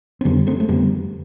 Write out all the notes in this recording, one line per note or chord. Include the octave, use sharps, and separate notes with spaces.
C4
F2 D3 G3 B3
A3 C4
A3
F2 D3 G3 B3